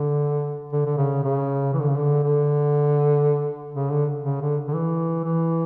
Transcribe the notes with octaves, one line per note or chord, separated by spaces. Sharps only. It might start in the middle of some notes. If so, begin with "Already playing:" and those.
Already playing: D3
D3
D3
C#3
C#3
E3
D3
C#3
D3
D3
C#3
D3
C#3
D3
D3
E3
E3